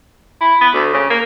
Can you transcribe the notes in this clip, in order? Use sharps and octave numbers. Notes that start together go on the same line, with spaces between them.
E4
B3
D2
C#3
A#3